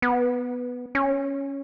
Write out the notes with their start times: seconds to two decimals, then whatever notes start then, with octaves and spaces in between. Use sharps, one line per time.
0.02 B3
0.95 C#4